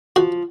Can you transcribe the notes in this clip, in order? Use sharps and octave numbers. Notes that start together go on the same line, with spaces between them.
F3 F#4